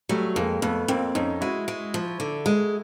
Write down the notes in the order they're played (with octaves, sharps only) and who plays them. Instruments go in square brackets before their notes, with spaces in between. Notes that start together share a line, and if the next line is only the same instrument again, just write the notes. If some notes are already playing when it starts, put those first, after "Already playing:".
[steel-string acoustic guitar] F#3 [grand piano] G3 A3
[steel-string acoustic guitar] F2 [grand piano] G#3 A#3
[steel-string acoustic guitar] F2 [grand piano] A3 B3
[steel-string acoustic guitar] F2 [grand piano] A#3 C4
[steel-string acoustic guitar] F2 [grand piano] C#4 D#4
[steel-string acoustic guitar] G#3 [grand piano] E4 F#4
[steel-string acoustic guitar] G#3
F3
D3
G#3